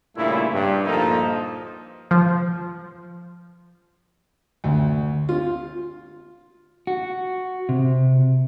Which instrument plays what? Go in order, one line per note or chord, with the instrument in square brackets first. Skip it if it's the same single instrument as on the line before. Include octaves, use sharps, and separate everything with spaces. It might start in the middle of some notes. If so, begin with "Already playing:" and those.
[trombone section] G2 A#2 C#3 A3 E4
G2
D2 A#2 F3 A#3 D#4 A4
[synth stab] F3
[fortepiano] D2
F4
[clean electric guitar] F#4
C3